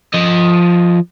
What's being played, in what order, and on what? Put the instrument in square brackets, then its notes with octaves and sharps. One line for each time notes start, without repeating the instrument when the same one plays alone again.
[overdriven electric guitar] F3 D#5